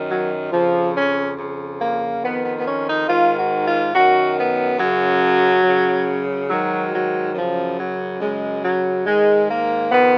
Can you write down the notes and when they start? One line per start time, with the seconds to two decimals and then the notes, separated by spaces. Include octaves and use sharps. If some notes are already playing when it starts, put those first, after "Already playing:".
Already playing: F#2 D#3
0.09 F#3
0.52 F2 C#3 F3
0.95 C#4
1.38 F2 C#3
1.80 A#3
2.23 F2 D#3 B3
2.44 B3
2.57 B3
2.65 C#4
2.87 D#4
3.08 G#2 D#3 F4
3.37 F#4
3.66 F4
3.94 F#2 D#3 F#4
4.36 B3
4.78 F#2 C#3 F#3
5.64 F#2 C#3
6.50 G#2 D#3 F#3
6.93 F#3
7.35 F#2 C#3 F3
7.78 F#3
8.20 F#2 C#3 G#3
8.63 F#3
9.06 G#2 D#3 G#3
9.49 A#3
9.91 F2 D#3 B3